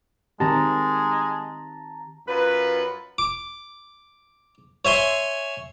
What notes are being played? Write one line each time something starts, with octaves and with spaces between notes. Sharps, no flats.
D#3 G#3 C4 G4 A5 A#5
F#2 F4 B4
D6
C#5 E5 G#5 C6